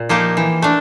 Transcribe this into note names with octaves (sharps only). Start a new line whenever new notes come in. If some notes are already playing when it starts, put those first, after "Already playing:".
Already playing: A#2
F3 A#3 D#4 G4
E3
A3 D4